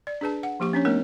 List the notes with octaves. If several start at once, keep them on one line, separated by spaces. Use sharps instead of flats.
D5
D4 G#4 B4 A5
F#5
F3 A#3 G4 C#6
C#4 D4 C#5
A3 B3 D#4 A#4 C#5